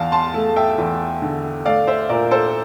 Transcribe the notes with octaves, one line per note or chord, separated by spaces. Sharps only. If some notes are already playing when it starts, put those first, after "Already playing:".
Already playing: E2 F5 A5
A5 C6
A3
E5 G5
E2
D3
A3 D5 F5
C5 E5
A#2 A#4 D5
A4 C5